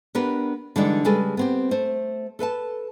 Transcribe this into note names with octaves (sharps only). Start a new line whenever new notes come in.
B3 D4 G4 A#4 B4
D3 E3 G3 G#3 D#4 D5
C#3 G3 G#3 G#4 A4 B4
B3 C4 G4
A3 C5
A4 B4 F5 A5